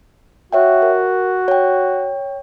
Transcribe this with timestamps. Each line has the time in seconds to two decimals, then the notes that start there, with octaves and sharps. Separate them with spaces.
0.52 F#4 C#5 E5 G5
0.82 A#4
1.48 C#5 G5